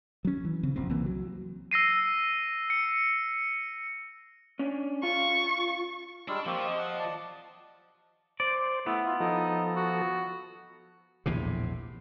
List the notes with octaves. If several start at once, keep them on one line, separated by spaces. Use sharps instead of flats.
F#3 C#4
E3
C#3 C4
F1 A#1 F#2 C4
C2 E3 A#3
F#3
E6 A#6 C7 D#7
C#7
C#4 D4
F4 C#6
G3 G#3 D4 C#6 E6 F6
F3 A#3 C4 G4 C#6
D#5 D#6
F#5
D5 A5
C5 D5
A3 B3 E4
F4
F3 D#4 A4
F#4
A#1 E2 A2 C3